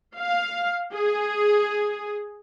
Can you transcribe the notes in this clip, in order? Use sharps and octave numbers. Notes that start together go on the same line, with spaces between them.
F5
G#4